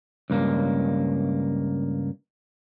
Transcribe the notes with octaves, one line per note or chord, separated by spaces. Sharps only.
C#2 G2 A#3